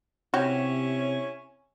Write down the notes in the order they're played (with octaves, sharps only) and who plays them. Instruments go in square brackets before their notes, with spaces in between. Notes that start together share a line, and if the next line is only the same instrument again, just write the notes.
[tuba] C3 [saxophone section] C#4 E4 C#5 [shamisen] F#4 G4